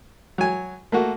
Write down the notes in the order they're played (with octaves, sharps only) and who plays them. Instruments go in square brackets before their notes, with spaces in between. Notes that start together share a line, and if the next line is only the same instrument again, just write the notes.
[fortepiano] F#3 G#5
A3 A#3 F#4